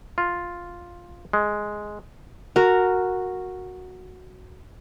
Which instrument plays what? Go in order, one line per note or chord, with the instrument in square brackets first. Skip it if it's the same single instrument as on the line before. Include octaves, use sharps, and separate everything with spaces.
[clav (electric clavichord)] F4
G#3
[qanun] F#4 A#4